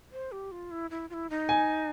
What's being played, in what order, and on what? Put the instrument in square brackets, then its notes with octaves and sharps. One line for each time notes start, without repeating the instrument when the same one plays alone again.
[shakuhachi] C5
G4
F4
E4
E4
F4
E4
D#4
[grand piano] G#5